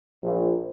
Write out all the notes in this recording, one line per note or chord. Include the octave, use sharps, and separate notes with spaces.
A#1